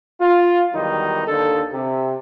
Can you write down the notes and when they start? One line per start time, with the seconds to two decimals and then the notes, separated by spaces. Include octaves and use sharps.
0.20 F4
0.73 E2 D#3 F#3 G3 D#4
1.26 D#2 D3 A4
1.73 C3